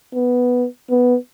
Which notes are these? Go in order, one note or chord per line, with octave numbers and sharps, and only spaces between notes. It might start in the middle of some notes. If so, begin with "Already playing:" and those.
B3
B3